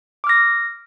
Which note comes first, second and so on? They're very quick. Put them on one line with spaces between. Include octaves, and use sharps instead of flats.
D6 F6 A#6